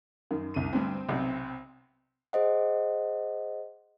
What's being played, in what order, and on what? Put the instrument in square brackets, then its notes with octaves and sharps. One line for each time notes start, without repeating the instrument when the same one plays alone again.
[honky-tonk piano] F#2 [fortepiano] D#3
[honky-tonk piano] C2 D#7
[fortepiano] D2 G2 [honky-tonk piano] C4
[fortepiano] B1 C3
[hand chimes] G#4 C5 D#5 F#5